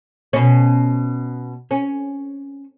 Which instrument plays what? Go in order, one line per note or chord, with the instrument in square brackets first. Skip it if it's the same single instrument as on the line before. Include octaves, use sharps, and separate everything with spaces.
[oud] B2 C#4
C#4